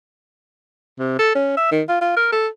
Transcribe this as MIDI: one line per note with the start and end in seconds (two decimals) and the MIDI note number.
0.99 1.19 48
1.19 1.35 69
1.35 1.53 61
1.57 1.70 76
1.71 1.82 51
1.88 1.98 65
2.01 2.14 65
2.16 2.27 70
2.32 2.48 69